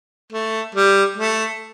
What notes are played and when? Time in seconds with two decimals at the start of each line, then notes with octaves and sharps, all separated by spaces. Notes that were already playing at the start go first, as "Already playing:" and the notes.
0.32 A3
0.75 G3
1.17 A3